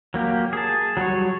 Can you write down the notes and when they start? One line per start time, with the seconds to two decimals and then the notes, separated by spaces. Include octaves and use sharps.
0.14 F#3 A#3 G4
0.53 G#4 A5
0.97 F#3 G3 F#4 C#5